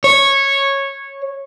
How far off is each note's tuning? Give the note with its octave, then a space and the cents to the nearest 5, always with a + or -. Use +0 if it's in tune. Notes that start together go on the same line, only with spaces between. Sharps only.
C#5 -10